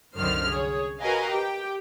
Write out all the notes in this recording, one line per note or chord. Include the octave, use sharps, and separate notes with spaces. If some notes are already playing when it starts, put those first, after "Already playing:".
C2 F#2 D3 D#3 C5 F6
G#4 C#5
F#4 A#4 B4 D#5 F5 G#5
G4 G5